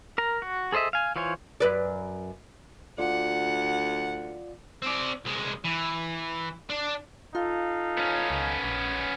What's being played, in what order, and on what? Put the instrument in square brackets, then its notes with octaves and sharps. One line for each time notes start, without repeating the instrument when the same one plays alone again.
[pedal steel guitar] A#4 A#5
F#4
G#4 A4 C5 D#5 E5
F5 G#5
E3 F4 C5 C#5 G#5
[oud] F#2 B4 D5
[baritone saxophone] D2 [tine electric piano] F4 D5 [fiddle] F#5
[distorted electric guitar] C4 D5
C2 G#3
E3
D4
[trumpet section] D#4 A4 F5 [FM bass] F4
[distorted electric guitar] B3 C#4
[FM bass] C#2
A#1